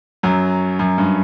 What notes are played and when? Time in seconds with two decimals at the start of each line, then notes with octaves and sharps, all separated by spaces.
0.23 F#2 F#3
0.79 F#2
0.98 G2